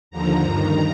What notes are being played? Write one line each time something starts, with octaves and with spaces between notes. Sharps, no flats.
D#2 D3 F3 A#5
G2 D#3 A#5